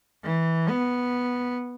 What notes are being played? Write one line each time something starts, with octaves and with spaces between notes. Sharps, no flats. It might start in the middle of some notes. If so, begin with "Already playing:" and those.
E3
B3